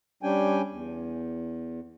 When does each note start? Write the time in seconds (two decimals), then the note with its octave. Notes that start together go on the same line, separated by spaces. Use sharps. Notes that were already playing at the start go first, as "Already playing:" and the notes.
0.23 G3 C#4 D4 G5 G#5
0.71 E2